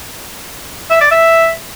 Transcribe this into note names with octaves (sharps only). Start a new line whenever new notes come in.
E5
D5
E5